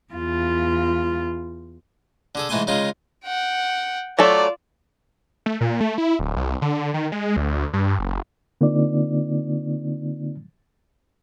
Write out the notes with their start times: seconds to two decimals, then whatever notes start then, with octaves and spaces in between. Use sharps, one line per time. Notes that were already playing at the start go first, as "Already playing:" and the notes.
0.13 E2 F4
2.35 D3 G#4 A4
2.49 G#2 E3 A3 B4 G#5 C6
2.67 C#3 G#3 D#4 F4 G#4
3.24 F#5 G5
4.19 F#3 A3 F4 A4 D5
5.46 A3
5.61 A#2
5.81 A3
5.98 E4
6.19 D1
6.37 C2
6.62 D3
6.94 D#3
7.12 G#3
7.36 D2
7.73 G2
7.99 F#1
8.61 D3 A#3 C4 D#4 F4 D5